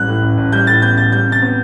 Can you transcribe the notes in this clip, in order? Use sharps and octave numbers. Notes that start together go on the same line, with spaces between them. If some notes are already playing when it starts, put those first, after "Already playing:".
Already playing: A1 G3 F#6
A2
A1
A1
G3 G6
A2 A6
B3 G6
A1 A6
G3 G6
C3
A6
B3